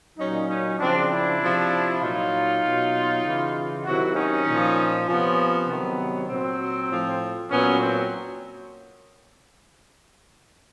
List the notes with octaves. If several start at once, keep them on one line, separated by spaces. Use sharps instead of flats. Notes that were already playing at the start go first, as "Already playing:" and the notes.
A#2 F#3 C#4 D#4
C#4 D#4
C#3 F3 C4 D4
D4 E4
C3 F3
A#2 F#3 D#4 F4
B2 F#3
C#3 E3
C3 D#3 F#3 E4 F#4
C#4 D#4
A#2 F3
C3 F3 B3 C#4
C3 D#3 F#3 B3
A#2 F#3 C4
A2 F3
A#2 F#3 B3 C#4
C4